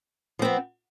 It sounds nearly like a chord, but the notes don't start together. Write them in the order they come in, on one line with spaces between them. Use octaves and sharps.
F3 C4 B3